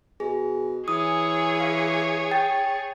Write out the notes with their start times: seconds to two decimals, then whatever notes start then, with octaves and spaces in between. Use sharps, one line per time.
0.20 B2 G#4
0.88 E3 G#4 C#5 D#6
1.60 F5
2.31 G5 A6